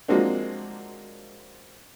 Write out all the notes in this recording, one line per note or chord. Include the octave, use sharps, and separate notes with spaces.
F3 F#3 G#3 A#3 C4 D4